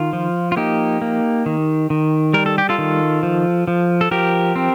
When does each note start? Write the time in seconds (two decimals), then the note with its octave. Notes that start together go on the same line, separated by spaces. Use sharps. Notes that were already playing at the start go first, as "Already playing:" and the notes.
Already playing: D#3 F4
0.13 F3
0.52 F4
0.56 A#3 D#4 G4
1.02 A#3
1.46 D#3
1.90 D#3
2.34 G3 A#4
2.46 A4
2.58 G4
2.69 F4 A4
2.78 D#3
3.23 F3
3.68 F3
4.01 A4
4.11 F3 G4 A#4
4.56 C4